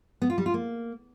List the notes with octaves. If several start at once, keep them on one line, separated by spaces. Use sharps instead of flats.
B3
F4
G3
F4
A#3